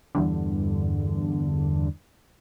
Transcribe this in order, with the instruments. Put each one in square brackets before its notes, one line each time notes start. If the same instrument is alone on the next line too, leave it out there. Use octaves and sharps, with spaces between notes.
[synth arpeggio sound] E2 G2 D3